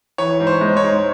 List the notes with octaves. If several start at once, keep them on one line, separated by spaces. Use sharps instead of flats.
E3 C#5
G#2
C5
G#3
C#5
G#2